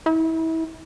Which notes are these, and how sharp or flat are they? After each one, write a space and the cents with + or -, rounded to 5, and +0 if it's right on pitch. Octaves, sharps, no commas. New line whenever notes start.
E4 -30